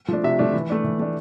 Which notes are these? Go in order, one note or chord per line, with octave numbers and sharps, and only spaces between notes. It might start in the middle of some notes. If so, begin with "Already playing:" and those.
F3 A3 D4
C3 E5
F3 A3 D4
E3
A3 D4
E3
A3 D4